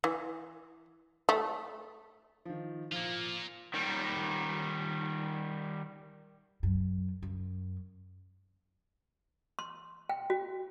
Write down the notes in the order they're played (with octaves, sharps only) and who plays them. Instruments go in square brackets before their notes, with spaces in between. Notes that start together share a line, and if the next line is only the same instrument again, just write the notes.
[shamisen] E3
A3
[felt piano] D#3 F3
[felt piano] F3 [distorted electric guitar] A#3 F4
[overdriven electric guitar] D#3 G3
[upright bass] F#2
F#2
[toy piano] C6
G5
F#4